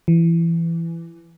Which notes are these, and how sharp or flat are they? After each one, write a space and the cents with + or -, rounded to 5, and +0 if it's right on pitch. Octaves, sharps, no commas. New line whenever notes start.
E3 +20